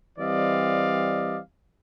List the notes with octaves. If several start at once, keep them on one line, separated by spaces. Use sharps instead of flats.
E3 G3 C4 D5 D#5 F5